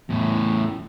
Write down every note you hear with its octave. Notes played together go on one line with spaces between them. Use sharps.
E2 A2